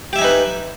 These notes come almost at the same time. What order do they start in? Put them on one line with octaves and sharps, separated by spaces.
G4 E5 G#5 D#4 B4